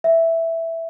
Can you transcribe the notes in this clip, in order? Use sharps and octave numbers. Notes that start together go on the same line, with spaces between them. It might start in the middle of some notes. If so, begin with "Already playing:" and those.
E5